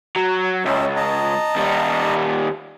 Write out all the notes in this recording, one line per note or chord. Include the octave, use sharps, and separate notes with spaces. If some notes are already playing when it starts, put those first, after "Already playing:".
F#3
C#2 C#4 D#5 E5
D#5 A5 A#5
D#2 G3